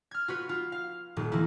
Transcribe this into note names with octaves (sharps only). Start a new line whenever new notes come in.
F6 G#6
F4 F#4 B4
F4
F5
D#1
E3 A#3 C4 E4